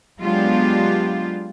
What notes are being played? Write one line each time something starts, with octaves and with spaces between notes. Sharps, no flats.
F#3 G#3 B3 D4 F4 G4